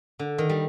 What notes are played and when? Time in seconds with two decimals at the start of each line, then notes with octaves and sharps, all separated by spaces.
0.19 D3
0.38 D#3
0.49 G3